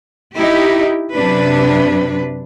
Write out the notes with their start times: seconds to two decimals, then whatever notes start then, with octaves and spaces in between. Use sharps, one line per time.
0.37 D#4 E4 G4
1.15 F#2 C3 D4 B4